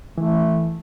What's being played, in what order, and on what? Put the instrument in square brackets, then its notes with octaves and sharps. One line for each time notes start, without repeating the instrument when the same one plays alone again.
[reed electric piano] E3 [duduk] A3